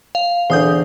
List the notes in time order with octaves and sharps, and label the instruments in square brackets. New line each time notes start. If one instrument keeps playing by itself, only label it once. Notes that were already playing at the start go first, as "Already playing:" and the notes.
[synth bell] F5
[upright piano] E2 D3 [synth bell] C5 D#6 G6